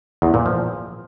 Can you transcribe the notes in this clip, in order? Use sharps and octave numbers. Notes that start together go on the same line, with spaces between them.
E2
A#2
F3